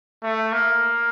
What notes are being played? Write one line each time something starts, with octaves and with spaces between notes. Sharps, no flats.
A3
A#3